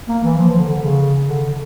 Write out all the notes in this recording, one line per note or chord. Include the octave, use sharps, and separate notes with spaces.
A#3
E3
F3
F3
D3
D3
C#3
D3